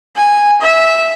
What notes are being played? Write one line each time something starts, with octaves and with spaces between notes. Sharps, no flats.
G#5
E5